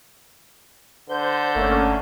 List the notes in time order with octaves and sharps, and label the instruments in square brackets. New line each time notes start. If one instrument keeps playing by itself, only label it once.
[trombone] D3 [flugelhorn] C5 [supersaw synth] G6
[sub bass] G1 [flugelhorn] A3 [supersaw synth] A#3 C#4